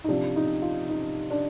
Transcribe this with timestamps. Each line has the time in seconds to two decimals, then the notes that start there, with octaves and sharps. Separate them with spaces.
0.04 D#4
0.08 C3 F3 D4
0.36 D#4
0.62 F4
0.89 D#4
1.30 D4